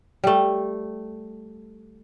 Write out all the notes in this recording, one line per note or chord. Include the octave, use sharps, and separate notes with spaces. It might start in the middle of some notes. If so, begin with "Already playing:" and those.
G3 A3